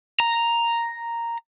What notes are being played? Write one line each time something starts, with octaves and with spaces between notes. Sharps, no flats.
A#5